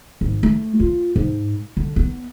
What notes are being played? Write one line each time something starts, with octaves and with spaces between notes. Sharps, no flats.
G#1
A3
F4
G#2
D3
B3